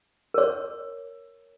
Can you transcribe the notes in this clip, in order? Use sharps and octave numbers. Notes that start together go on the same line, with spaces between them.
A#4 C#5